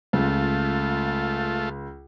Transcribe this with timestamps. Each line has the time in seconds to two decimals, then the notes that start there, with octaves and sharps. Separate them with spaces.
0.13 C#2 A3 F4